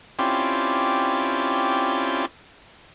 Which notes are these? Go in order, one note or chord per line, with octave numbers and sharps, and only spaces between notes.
C4 C#4 E4 F4 G4 D5